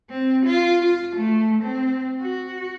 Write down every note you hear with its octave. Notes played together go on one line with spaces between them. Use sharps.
C4
F4
F4
A3
C4
F#4